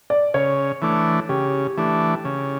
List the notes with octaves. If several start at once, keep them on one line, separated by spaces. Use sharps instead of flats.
D5
C#3 C#5
E3 A3 D4
C#3 G4
E3 A3 D4
C#3